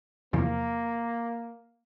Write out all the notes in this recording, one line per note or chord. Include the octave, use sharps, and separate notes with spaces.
E2 C3 F3 A#3